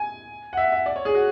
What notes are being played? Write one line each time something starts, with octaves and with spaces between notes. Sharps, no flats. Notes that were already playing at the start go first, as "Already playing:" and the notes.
Already playing: G#5
F#5
E5
E5
D5
C#5
G#4
F#4